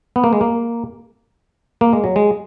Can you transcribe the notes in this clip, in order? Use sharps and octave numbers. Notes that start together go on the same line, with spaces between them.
B3
A#3
G#3
A#3
A#3
G#3
F#3
G#3